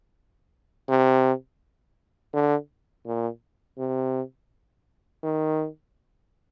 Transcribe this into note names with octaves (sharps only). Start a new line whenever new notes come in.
C3
D3
A#2
C3
D#3